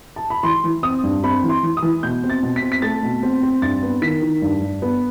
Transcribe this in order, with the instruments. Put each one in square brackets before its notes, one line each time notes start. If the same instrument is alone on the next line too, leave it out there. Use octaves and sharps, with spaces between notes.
[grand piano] A5
B5
E3 C6
E3
C4 D#6
G2
C4 B5
E3
C6
E3
D#6
E3
B2 G6
C4
A6
B2
B6
C4
B6
A3 A6
B2
C4
C4
G2 A6
B3
D#3 B6
D#3
G2
G2
B3